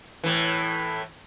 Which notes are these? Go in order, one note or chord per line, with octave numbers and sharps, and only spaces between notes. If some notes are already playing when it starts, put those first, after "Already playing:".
A2 E3